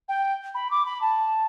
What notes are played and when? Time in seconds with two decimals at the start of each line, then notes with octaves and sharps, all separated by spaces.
0.09 G5
0.54 B5
0.71 D6
0.85 B5
1.01 A5